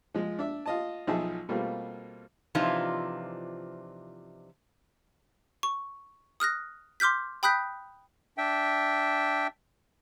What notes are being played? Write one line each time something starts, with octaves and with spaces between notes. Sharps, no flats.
F3 G#3
D4 E5
F4 D#5 A5
B1 F3 D#4 G#4 E5 A5
B2 G3 A3 A#3 C4 F4
C3 E3 F3 D4 D#4 F4
C#6
D#6 F6 F#6 A#6
C6 D6 F6 G6 B6
G5 B5 D#6 F#6 G6 B6
D4 E5 G5